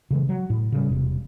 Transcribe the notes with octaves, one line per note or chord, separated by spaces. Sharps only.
C#3 E3 G#3
F#3
A2
C#3 G3
E1 C3